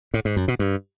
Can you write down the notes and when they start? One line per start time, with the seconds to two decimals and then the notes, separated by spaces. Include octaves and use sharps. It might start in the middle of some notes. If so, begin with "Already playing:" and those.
0.14 A2
0.25 G#2
0.37 F#2
0.48 B2
0.59 G2